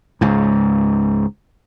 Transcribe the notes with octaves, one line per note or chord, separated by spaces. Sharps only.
C#2 G#2